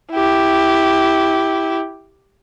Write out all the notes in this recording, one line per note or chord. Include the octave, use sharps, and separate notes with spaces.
E4 G4